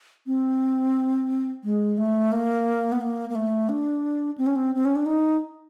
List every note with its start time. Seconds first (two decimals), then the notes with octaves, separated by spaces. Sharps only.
0.27 C4
1.64 G#3
1.98 A3
2.32 A#3
2.92 B3
3.01 A#3
3.29 A#3
3.35 A3
3.69 D4
4.38 C4
4.47 C#4
4.56 C4
4.75 C4
4.85 C#4
4.96 D4
5.06 D#4